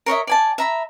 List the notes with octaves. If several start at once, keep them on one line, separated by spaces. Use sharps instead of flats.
A#4 C#5 D#5 E5
D5 G#5 A5
E5 A#5 B5